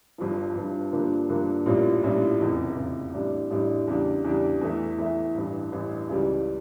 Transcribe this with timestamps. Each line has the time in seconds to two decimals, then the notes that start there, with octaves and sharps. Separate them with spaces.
0.18 G1 G2 F3
0.55 G1 G2 F3
0.92 G2 D3 F3 A#3
1.29 G2 D3 F3 A#3
1.66 A#1 A2 G3 C#4 F4
2.03 A#1 A2 G3 C#4 F4
2.40 F1 E2 C#3
2.77 F1 E2 C#3
3.14 A1 A2 G3 D4
3.50 A1 A2 G3 D4
3.87 E2 C#3 G3 D4
4.24 E2 C#3 G3 D4
4.61 E2 E3 A3 E4
4.98 E2 E3 A3 E4
5.35 A1 G2 E3
5.72 A1 G2 E3
6.09 C#2 C#3 E3 G3